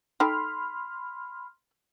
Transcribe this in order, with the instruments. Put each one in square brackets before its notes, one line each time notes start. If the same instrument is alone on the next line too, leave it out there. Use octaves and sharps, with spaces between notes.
[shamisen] D#4 A4 G5 [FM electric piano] B5 C6 F6